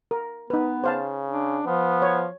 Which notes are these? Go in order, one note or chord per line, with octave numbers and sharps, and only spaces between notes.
A#4
B3 D#4 B4
C#3 C5 F5 A5
D4
F3 B3
C#5